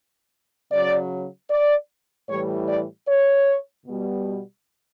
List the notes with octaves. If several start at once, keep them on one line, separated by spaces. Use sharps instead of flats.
C#3 F#3 D5
D5
A2 E3 G3 C#5
D5
C#5
B2 G3